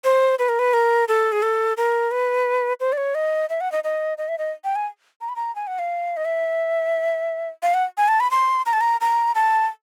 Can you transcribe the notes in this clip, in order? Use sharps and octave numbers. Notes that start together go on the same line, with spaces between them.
C5
B4
A#4
B4
A#4
A4
G#4
A4
A#4
B4
C5
D5
C#5
D#5
E5
F#5
D#5
D#5
D#5
E5
D#5
G5
G#5
A#5
B5
A#5
G#5
F#5
F5
D#5
E5
F5
F#5
G#5
A5
B5
C6
A#5
A5
A#5
A#5
A5